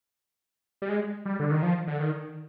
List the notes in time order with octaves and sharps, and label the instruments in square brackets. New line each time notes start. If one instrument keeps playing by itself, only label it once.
[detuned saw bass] G3
G#3
G3
D3
D#3
F3
D3
D#3